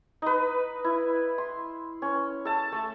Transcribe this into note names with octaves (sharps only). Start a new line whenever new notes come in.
D#4 B4
E4
C6
C#4
A4 A5
A3